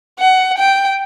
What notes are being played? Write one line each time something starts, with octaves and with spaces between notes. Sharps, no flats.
F#5
G5